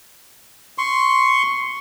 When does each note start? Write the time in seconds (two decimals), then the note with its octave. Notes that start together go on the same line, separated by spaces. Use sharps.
0.78 C6 C#6